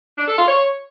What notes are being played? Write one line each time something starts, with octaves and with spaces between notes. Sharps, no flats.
D4
A4
F4
C#5